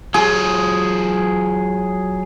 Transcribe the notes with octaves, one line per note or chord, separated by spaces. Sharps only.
F#3 F4 G#4